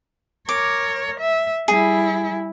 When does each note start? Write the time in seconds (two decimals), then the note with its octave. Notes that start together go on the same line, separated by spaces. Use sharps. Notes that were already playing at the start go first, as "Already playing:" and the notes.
0.49 A#4 C#5 D6
1.20 E5
1.68 G3 E4 G#4